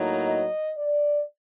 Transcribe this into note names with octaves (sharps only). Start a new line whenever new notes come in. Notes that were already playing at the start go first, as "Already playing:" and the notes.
Already playing: A2 F#3 A#3 D#4
D#5
D5